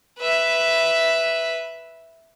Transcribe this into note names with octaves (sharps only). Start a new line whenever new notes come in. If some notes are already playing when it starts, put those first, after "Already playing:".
B4 E5